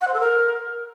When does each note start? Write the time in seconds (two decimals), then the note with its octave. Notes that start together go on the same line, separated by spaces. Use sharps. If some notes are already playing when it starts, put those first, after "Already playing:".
0.01 F#5
0.07 C5
0.13 A4
0.20 A#4